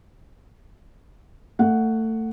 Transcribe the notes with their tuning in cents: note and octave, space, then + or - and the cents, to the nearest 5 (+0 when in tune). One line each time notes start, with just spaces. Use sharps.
A3 +25 F#5 +0